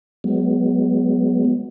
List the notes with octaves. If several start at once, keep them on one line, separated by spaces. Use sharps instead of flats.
F#3 G#3 B3